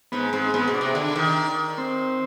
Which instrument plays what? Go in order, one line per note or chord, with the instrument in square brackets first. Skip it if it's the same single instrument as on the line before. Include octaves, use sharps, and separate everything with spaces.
[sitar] G#2 [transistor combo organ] B3
[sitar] G#2 [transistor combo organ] C4
[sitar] G#2 [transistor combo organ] B3
[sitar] B2
[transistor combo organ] D4
[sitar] C3
D3
D#3
[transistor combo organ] C4